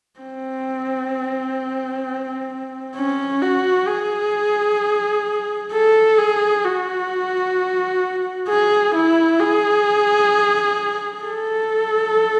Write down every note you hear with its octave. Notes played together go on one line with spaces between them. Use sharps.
C4
C#4
F#4
G#4
A4
G#4
F#4
G#4
E4
G#4
A4